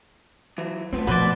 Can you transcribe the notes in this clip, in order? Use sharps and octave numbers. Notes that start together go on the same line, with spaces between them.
E3 F#3
A3 B3 C4 F4
B2 F3 B4 C5 D5